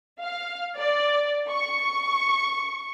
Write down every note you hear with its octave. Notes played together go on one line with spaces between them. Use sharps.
F5
D5
C#6